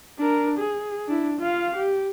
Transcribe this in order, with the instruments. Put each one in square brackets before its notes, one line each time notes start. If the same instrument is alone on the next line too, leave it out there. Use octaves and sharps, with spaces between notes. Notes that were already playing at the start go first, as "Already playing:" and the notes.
[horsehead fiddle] D4 A#4
G#4
D4 E4
F4 F5
G4